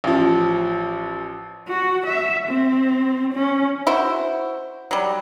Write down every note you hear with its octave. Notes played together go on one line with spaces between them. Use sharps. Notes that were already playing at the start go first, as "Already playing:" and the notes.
A1 F3
F#4
E5
C4
C#4
E4 F#4 C5
F#3 G3